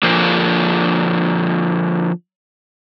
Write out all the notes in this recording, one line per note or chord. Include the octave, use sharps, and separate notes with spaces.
D3 F3 A#3